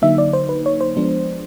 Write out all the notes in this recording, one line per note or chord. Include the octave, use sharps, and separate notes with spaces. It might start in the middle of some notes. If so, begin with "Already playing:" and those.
D3 F#3 A#3 D#4 E5
D5
C5
B4
C#5
C5
F3 G#3 B3 D4